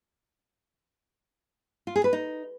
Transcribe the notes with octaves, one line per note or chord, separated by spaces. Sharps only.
F4
G#4
B4
D#4